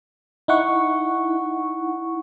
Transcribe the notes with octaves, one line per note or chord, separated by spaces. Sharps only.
D#4 E4 F#5 C#6